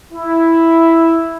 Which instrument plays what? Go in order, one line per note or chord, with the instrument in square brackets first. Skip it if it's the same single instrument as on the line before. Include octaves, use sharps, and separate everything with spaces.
[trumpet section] E4